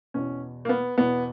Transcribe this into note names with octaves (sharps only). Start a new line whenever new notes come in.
E2 B2 C#4
A#3
B3
E2 B2 B3